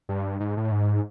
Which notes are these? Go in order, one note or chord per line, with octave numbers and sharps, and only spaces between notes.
G2
G#2
A2
G#2